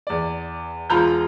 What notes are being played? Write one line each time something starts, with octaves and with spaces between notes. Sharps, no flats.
E2 D5
E1 F4 A#5 B5 G6